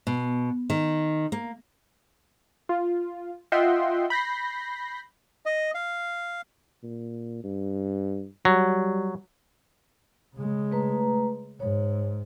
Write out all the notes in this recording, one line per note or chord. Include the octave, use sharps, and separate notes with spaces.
B2
D#3
A#3
F4
F4 D#5 E5 F#5 G5 C6
B5 G6 A#6 C7
D#5
F5
A#2
G2
F#3 G3
C#3 G#3
A3 B4 A#5
G#2 C#5